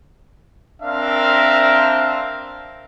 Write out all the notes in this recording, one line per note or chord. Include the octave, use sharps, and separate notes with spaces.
C4 D4 A#4 E5 F5